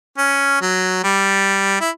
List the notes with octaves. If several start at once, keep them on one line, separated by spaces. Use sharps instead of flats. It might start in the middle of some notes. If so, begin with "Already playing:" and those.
C#4
F#3
G3
E4